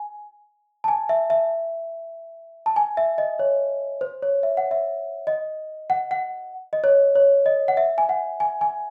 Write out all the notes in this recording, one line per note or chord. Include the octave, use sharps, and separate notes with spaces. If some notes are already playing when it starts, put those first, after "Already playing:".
Already playing: G#5
A5
G#5
E5
E5
A5
G#5
E5
D#5
C#5
C5
C#5
E5
F#5
E5
D#5
F#5
F#5
D#5
C#5
C#5
D#5
F#5
E5
G#5
F#5
G#5
G#5